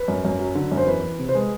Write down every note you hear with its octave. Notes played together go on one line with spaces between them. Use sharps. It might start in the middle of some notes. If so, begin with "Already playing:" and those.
Already playing: B4
F#2
F#2
F#3
D3
F#2
C5
E2 B4
E3
C3
C5
G#3 B4